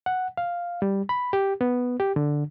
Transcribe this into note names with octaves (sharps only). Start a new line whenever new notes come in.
F#5
F5
G3
B5
G4
B3
G4
D3